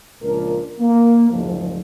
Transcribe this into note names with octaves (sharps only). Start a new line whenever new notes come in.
C#2 A#2 F3 D4 A#4
A#3
F#1 D2 G#2 F3